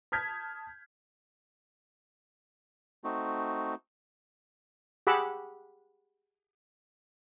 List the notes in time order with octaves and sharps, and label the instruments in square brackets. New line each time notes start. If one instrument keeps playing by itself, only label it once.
[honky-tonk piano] A5 D#6 F6 G6 G#6 B6
[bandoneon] A3 C4 D#4 F#4
[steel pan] G4 G#4 F#5 B5 D6 E6